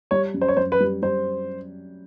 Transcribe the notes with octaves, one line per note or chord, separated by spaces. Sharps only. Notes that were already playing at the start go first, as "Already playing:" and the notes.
G3 C#5
F#2
C5
C#5
F#2 C5
B4
G3
G3 C5